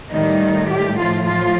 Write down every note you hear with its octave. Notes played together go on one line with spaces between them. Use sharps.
A2 D#3 G3 D#4
G3 G4
F3 F4
F3 F4